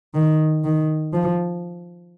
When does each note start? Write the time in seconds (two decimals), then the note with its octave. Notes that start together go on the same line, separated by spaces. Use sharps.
0.15 D#3
0.64 D#3
1.13 F3